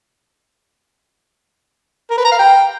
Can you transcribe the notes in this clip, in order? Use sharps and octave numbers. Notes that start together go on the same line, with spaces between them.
A#4
B4
A#5
F5
G5